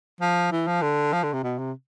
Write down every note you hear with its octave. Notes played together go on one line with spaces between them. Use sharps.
F3
E3
F3
D3
F3
D3
C3
B2
C3